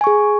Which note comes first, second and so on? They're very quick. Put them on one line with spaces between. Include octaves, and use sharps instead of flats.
G#5 C#6 G#4